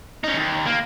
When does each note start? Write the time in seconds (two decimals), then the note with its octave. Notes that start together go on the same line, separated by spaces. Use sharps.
0.24 C#4 D#4
0.37 D#2
0.67 A#3